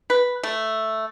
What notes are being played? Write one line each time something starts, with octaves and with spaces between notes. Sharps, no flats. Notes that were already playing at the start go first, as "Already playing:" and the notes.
B4
A3